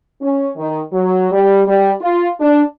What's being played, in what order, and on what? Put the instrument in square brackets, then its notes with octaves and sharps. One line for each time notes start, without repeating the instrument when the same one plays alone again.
[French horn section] C#4
D#3
F#3
G3
G3
F4
D4